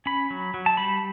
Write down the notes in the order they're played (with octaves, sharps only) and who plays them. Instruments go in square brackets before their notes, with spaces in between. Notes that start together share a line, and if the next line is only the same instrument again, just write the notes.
[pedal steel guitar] C#4 B5
F#3
F#3
A5
G3 B5